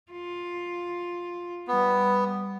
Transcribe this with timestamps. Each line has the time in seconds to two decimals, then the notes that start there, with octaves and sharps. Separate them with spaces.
0.12 F4
1.68 G3 B3